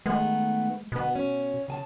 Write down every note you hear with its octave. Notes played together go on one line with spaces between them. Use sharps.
D#3 G#3 A3 B3
B2 D3 B3
C#4
C#3 G#5 A5